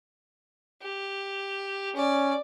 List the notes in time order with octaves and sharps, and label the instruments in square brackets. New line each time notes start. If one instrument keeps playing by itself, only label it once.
[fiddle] G4
[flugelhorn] C#4 [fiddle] D5